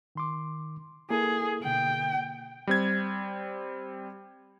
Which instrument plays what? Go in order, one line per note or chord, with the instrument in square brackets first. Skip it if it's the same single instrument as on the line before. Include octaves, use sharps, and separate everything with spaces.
[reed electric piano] D#3 C6 D6
[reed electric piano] A#3 E4 A4 [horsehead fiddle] G#4
[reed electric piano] B2 D3 A#3 [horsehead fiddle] G5
[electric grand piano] G3 C4 G#6